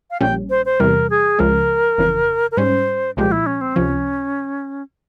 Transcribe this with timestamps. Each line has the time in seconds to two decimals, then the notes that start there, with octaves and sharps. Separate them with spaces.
0.11 F5
0.21 A#1 A#2 G3 C#4 G5
0.50 C5
0.66 C5
0.80 E2 C3 E3 G3 A#4
1.10 G#4
1.39 C#2 C#3 F3 G#3 A#4
1.98 G1 F2 C#3 E3
2.51 A#4
2.57 G#2 G3 C#4 C5
3.17 C2 A#2 F3 G#3 G4
3.32 E4
3.46 C#4
3.61 C4
3.76 C#2 C3 F3 C#4